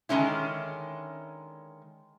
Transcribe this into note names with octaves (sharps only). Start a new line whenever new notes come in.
D3 D#3 G#3 C#4 E4